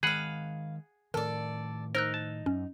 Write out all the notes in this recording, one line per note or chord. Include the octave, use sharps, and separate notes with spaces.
D#3 G#3 G#4 F5 F#5 B5 F#6
A2 D#3 A4 A#4 D5
D#4 A#4 C5 E6 F#6
A5
F#2 C#4